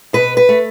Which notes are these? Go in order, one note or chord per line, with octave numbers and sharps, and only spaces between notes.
B2 B4
B4
A3